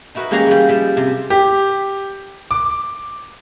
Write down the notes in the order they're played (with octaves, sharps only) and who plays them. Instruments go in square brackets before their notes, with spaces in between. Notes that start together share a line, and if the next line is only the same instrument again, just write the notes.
[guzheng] D#4 E4 F#4 A#4 B4
E3 G#3 A#3 C#4 G4 A#5
E3 G3
F3 G3 E5
C3
[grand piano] G4
D6